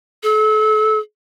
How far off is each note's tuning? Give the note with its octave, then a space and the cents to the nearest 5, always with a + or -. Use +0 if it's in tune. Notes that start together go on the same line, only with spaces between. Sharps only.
A4 -35